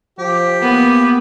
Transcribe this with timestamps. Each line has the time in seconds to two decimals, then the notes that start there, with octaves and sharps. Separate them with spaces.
0.19 F3 G4
0.62 A#3 B3